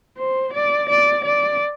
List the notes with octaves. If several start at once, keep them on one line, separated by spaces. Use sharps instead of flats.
C5
D5
D5
D5